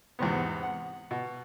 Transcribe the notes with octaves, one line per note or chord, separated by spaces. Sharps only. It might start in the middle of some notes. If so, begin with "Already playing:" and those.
E2 G#2 C3 B3
F#5
B2